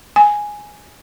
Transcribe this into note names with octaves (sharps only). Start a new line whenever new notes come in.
G#5